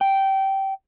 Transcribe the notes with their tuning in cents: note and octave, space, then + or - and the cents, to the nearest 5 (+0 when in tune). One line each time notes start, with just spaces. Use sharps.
G5 -15